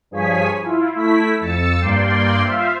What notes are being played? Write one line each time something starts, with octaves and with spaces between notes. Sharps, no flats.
G2 F3 G#4 C#5 G#5 B6
E4 F4
A3 E4 B6
F2 E6 A6 C#7
G2 A#3 D5 G5 C6
F4 C5 E5 F5